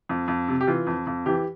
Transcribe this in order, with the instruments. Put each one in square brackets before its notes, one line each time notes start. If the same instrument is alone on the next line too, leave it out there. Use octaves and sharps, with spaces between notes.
[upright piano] F2
F2
C3
G4
E3 F4
F2
F2
E3 G4